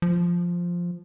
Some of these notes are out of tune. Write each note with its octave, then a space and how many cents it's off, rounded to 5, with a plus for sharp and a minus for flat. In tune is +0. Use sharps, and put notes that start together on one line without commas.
F3 +0